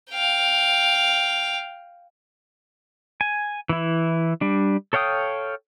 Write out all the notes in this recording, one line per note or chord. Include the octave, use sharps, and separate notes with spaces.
F5 G5
G#5
E3 E4
G3 D4
A4 C#5 F5 G5 D#6